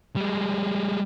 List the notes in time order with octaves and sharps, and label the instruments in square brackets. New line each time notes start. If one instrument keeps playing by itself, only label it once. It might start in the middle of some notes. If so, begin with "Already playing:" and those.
[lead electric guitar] G3 G#3